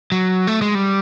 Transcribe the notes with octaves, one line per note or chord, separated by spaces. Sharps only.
F#3
A3
G#3
G3